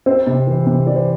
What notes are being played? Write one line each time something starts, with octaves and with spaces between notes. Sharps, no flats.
C4 C5
C3
E3
C3
E3 D5
C5